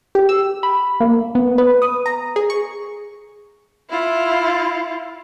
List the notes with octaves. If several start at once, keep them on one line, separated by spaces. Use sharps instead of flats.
G4
E6
B5
A#3
B3
B4
D#6
A#5
G#4
C#6
E4 F4